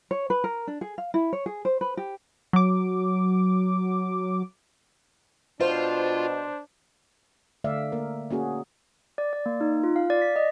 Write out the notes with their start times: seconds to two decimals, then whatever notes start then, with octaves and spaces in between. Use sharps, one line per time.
0.11 C#5
0.30 B4
0.44 A#4
0.67 D4
0.81 G#4
0.98 F5
1.14 E4
1.33 C#5
1.46 G#4
1.65 C5
1.81 B4
1.97 G4
2.53 F#3 D6
5.61 B2 D4 F4 C5
7.64 D3 A3 D5 E5 F5
7.92 A#3 A#4
8.30 A#3 C#4 F#4 G#4
9.18 D5
9.33 D5
9.46 A#3
9.61 D#4
9.84 F4
9.96 F5
10.10 D5
10.22 B6
10.36 D#5